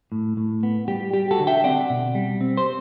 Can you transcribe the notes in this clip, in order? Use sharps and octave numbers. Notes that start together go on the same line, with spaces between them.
A2
A2
B3
G3 G4
G3 G4
F#4 A4
D3
E5 G5
C4 D5 F#5
B2
G3
C4
C5